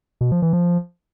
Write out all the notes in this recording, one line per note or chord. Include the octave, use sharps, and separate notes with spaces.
B2
F3
E3
F3